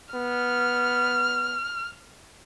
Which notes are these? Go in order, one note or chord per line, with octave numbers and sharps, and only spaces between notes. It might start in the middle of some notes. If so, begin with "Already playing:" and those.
B3 F6